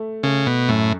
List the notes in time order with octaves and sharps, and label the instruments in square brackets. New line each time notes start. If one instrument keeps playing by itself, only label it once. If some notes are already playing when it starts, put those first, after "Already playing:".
Already playing: [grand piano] A3
[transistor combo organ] C#3 [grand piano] A3
[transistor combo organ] B2
[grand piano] F#2 [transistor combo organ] A2